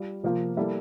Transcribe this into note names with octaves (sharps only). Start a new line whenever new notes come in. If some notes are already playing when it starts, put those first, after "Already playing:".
Already playing: G3 F4
C3 F3 A#3 F4
G3 A#3 E4 A4 E5